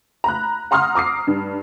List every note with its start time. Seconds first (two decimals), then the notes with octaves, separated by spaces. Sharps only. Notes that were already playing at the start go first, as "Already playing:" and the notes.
0.24 A#5 B5 F#6
0.71 F#5 A#5 C6 D#6 F6
0.95 A#5 D6 D#6 C7
1.27 G2